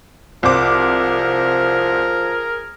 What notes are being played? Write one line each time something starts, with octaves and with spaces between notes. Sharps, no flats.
C2 F3 G#4 A#4 C5 D6